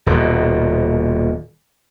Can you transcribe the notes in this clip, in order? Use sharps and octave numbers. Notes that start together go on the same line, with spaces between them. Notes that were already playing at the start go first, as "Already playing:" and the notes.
D#1 B2